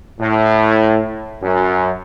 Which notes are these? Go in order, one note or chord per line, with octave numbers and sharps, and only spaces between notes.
A2
F#2